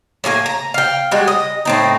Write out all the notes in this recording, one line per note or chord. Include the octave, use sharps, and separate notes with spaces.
A2 A#3 G#4 G#5
A#5
F5 G5
G3 G#3 F#4
D#5
A2 C4 D#4